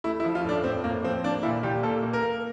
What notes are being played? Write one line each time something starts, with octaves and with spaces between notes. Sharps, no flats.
A3 E4
E4
F3
F4
A2 D4
A2 C4
A2 A#3
F3 C4
A#3 D4
A#2 E4
A#2 G4
A#3 A4
A#3
A#4
A#3